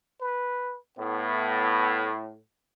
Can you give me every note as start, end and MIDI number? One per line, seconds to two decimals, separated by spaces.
0.21 0.78 71
0.98 2.36 45
0.98 2.13 59